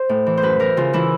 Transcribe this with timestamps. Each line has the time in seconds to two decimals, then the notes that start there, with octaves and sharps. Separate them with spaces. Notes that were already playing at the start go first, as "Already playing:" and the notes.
Already playing: C5
0.09 A2
0.26 E3
0.37 C5
0.42 F#2 B4
0.59 E3 A#4
0.77 C#3 F4
0.93 E3 E4